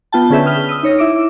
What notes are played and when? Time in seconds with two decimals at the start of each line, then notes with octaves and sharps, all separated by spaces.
0.12 B3 F4 G5 A5
0.30 D3 C#4 G#4 B4 E5 G6
0.45 B4 D#6 F6 G7
0.69 D#6 E6 D#7
0.83 D#4 C#5 A#6
0.98 E4 E5 D6 D7